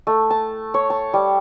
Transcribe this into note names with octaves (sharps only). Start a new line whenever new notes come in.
A3
A5
C#5
A5
G3